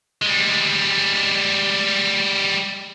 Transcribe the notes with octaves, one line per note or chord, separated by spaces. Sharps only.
G3 G#3